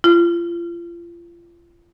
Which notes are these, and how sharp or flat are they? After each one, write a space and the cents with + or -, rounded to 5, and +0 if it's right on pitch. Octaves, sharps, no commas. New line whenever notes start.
F4 -35